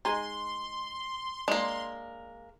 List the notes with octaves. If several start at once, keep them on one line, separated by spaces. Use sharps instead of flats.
G#3 D#4 C6
G#3 A#3 D4